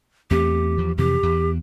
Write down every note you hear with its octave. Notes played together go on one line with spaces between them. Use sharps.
E2 A3 C4 G4
E2 F3
F2 C3 E3 G4
E2